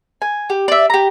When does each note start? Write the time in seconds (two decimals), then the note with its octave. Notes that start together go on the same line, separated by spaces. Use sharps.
0.22 G#5
0.50 G4
0.68 D5 E5
0.90 G4 A#5